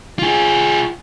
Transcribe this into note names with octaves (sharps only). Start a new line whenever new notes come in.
F4 G#4